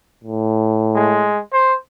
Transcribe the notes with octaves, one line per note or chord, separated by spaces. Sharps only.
A2
G#3
C5